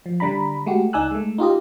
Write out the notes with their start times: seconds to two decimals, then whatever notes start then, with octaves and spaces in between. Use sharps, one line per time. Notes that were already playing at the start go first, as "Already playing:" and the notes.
0.06 F3
0.20 D3 G3 D4 A#5 B5
0.66 G#3 A3 F#4 G4
0.93 C#2 D#4 D5 G#5 E6 F#6
1.11 G#3 A3
1.38 D#4 F4 G4 D#5